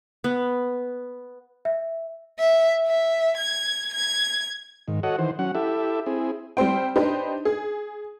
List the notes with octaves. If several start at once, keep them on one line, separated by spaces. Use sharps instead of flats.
B3
E5
E5
E5
G#6
G#6
G#2 D#3
F#4 A4 C#5 D#5 F#5
D#3 E3 C5
F#3 C#4 F#5
E4 G4 A4 E5
C4 E4 G#4
G3 C4 C5 G5
D4 D#4 G4 B4 C5
G#4